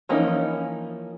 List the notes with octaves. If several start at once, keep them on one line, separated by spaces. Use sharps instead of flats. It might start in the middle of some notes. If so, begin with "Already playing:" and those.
E3 F3 A#3 C#4 D#4